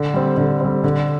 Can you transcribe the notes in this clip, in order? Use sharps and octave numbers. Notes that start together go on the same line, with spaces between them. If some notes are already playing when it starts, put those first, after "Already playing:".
Already playing: D3
G3 C4
D3
G3 C4
D3